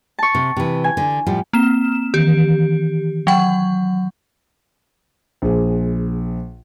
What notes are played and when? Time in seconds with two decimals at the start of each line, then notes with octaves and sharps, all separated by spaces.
0.19 A5 C#6
0.35 C3
0.57 C3 E3
0.84 G#5
0.97 D3
1.27 A2 F3 G3
1.53 A#3 C4 E7
2.14 D#3 E3 G4
3.27 F#3 F#5 G5
5.42 A#1 G#4